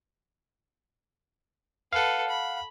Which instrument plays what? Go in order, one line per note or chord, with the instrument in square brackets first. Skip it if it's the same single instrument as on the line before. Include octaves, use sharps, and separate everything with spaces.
[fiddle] A4 B4 [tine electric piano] F5 F#5
[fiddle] B5